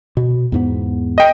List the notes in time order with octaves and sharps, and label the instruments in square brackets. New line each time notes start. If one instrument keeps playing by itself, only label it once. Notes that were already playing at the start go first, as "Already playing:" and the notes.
[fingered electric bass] B2
E2 G#2 B3
[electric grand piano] D#5 G5